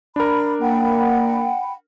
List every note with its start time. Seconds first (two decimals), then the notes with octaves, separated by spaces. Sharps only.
0.16 D4 A#4 B5
0.61 A#3 F#5 G5 B5